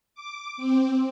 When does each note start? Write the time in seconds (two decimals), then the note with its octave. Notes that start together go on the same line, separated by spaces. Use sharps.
0.15 D6
0.57 C4